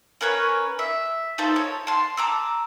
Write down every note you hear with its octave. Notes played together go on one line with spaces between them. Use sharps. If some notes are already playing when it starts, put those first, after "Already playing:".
C#4 A#4 B4 C#5
E5
D#4 F4 A4 C5
C#5
A5 C6
A#5 D6 E6